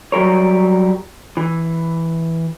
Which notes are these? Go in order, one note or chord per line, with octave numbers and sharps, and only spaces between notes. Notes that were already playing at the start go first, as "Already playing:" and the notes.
F#3 G3 A#4 C#5
E3